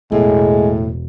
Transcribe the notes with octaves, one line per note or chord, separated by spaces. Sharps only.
E1 A2 G#3